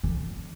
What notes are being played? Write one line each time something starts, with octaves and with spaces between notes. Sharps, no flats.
D3